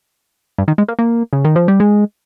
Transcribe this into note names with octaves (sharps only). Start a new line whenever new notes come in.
G2
D#3
G#3
A#3
A#3
C#3
D#3
F3
G3
G#3